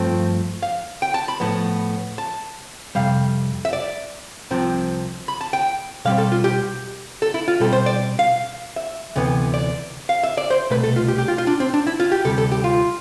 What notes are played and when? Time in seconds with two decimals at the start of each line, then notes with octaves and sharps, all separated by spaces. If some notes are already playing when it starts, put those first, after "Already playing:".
Already playing: G2 F3 A3 C4
0.62 F5
1.02 G5
1.14 A5
1.28 B5
1.40 A2 F3 B3 A5
2.18 A5
2.95 F2 C3 G3 F5
3.65 E5
3.73 D5
4.51 C2 C3 F3 C4
5.28 B5
5.41 A5
5.53 G5
6.05 B2 G3 C4 F5
6.18 A4
6.32 F4
6.44 G4
7.22 A4
7.34 E4
7.48 F4
7.60 B2 G3 C4 A4
7.73 C5
7.86 D5
8.19 F5
8.76 E5
9.16 D2 C3 E3 B3
9.54 D5
10.09 F5
10.23 E5
10.37 D5
10.50 C5
10.70 C2 B2 A3 B4
10.84 A4
10.96 F4
11.08 G4
11.18 G4
11.28 F4
11.38 F4
11.47 D4
11.60 C4
11.74 D4
11.87 E4
12.00 F4
12.12 G4
12.25 D2 C3 G3 A4
12.38 A4
12.52 G4
12.64 F4